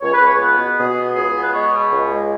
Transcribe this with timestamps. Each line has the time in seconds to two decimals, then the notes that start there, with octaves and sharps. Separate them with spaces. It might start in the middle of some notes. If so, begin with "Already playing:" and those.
0.01 C#2 C#5
0.13 B4
0.21 C#2 C#5
0.39 B3 B4
0.59 B2
0.78 B2 G#4
0.97 B3
1.15 C#2 G#4
1.35 B3
1.44 B4
1.54 G#3 C#5
1.73 B2
1.92 C#2
2.11 G#3